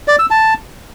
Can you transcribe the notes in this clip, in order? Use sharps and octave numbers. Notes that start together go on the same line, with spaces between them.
D5
E6
A5